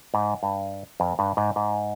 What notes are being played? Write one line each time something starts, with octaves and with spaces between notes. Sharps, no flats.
G#2
G2
F2
G2
G#2
G#2